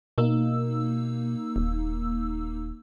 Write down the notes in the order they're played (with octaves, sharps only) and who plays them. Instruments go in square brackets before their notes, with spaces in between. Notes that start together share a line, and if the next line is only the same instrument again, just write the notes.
[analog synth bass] B2 [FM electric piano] A#3 D#4 E6
[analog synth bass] D#1